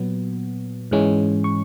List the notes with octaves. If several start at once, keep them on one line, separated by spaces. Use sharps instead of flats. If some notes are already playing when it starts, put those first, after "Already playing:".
Already playing: A#2 F#3 B3
G#2 E3 G#3 C#4
C#6